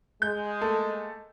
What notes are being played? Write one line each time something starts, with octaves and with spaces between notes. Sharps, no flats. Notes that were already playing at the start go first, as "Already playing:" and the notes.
G#3 G6
A3 A#3 A4